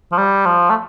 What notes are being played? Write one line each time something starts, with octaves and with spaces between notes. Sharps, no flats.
F3
G3
F3
A3